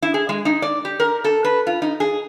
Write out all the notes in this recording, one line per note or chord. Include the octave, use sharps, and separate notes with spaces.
E4
G#4
G#3
D#4
D5
G4
A#4
A4
B4
F4
D#4
G#4